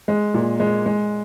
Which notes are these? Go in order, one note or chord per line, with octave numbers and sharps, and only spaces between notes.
G#3
A#2
G#3
G#3